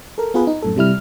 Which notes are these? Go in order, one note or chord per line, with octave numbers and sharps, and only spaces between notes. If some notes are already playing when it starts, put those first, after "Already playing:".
A4 A#4
B3 F4 G#4 B4
D#4
F#2 A2 A4
C3 G3 E4 F6